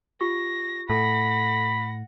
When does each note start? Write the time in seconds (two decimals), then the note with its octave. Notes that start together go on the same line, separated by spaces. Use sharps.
0.21 F4 G4 C#6 A#6
0.90 A2 A4 F#5 B5 A#6